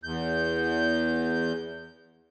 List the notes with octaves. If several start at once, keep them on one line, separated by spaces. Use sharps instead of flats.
E2 G6